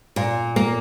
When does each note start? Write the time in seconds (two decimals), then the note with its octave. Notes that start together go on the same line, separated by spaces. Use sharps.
0.16 A#2
0.56 A#3